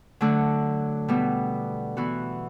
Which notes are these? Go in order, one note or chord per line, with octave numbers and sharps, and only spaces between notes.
D3 F#3 A3
B2 G3 B3
E3 B3 F#4